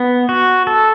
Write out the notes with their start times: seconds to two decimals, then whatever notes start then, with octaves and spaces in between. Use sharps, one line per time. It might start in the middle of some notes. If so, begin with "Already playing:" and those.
Already playing: B3
0.29 F#4
0.67 A4